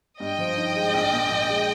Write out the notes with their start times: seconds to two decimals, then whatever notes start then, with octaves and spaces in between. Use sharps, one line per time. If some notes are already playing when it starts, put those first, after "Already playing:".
0.20 G2 D#5 G5
0.39 F3
0.57 D#4
0.76 G#3
0.94 A#1
1.13 A#2
1.30 A#1
1.49 G#3